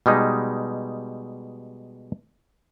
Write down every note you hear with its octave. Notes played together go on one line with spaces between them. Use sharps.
B2 G3 G#3 D#4